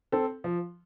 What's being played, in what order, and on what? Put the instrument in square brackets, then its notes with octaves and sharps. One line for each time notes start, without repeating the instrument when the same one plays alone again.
[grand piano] C4 A4
F3